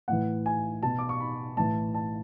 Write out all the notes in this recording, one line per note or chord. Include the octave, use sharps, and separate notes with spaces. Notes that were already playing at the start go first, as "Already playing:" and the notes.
A2 E3 F#5
G#5
B2 A5
D6
C#6
B5
A2 E3 A5
A5